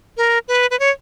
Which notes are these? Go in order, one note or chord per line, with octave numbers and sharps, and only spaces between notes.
A#4
B4
B4
C#5